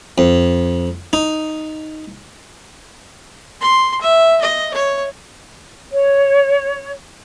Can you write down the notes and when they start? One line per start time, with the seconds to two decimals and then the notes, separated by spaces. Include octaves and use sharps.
0.18 F2
1.13 D#4
3.61 C6
4.01 E5
4.41 D#5
4.74 C#5
5.92 C#5